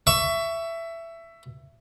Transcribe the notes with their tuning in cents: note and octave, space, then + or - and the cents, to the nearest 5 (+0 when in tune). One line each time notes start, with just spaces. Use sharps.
E5 +15 C#6 +20